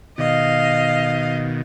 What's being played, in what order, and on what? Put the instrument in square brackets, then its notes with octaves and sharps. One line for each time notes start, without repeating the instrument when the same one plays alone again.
[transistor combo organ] B2 D#3 [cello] D#5 F5